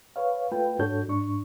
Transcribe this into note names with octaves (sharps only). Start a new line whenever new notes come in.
B4 C#5 F5
A3 F4 B4 G5
G#2 D4 F#4 A4 C#5 G6
G#2 D4 C#6